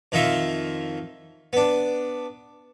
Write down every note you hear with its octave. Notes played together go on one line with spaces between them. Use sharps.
F2 D#3 D#4 F4 E5
B3 D4